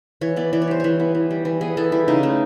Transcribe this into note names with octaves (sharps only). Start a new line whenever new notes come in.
E3 C#5
B3 D5
E3 D5
C#5
G3 C5
E3 C#5
B3
E3
G3
E3
B3 G#4
E3 A4
G3 E4
C#3 D#4
A3